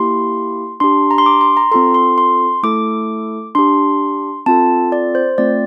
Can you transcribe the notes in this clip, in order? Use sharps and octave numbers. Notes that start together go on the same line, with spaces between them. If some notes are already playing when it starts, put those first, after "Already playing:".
Already playing: A#3 E4 G4 C6
D4 G4 C6
A#5
C6
D6
C6
A#5
C4 F4 A4 C6
C6
C6
A3 E4 A4 D6
D4 G4 C6
C4 F4 A4 A5
D5
C5
A3 C4 F4 D5